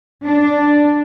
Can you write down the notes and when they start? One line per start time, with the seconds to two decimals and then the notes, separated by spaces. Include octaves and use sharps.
0.25 D4